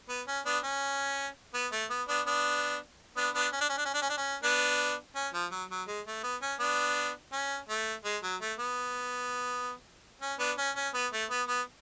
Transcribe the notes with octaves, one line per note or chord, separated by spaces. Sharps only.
B3
C#4
B3 D4
C#4
B3
A3
B3
B3 D4
B3 D4
B3 D4
B3 D4
C#4
D4
C#4
D4
C#4
D4
C#4
D4
C#4
B3 D4
C#4
F3
F#3
F#3
G#3
A3
B3
C#4
B3 D4
C#4
A3
G#3
F#3
A3
B3
C#4
B3 D4
C#4
C#4
B3
A3
B3
B3